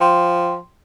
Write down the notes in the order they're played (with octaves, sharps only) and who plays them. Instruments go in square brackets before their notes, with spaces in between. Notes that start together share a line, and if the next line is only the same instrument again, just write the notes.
[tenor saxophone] F3 [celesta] G5 C6